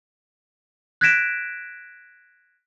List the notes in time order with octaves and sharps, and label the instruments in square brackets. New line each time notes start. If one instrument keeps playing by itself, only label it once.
[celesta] F#6 G#6 A#6 B6 D7 E7